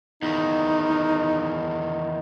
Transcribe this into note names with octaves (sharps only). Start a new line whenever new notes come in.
E2 D#3 D#4